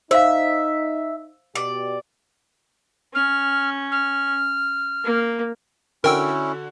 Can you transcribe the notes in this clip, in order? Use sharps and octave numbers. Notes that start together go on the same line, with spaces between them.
D#4 C5 E5 F5
B2 G4 D5
C#4 F6
F6
A#3
D3 C#4 E4 F#4 A#4 G5 E6